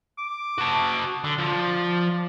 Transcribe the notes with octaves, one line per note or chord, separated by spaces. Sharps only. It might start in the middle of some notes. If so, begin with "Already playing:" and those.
D6
F#4 A5
D3 D5
F3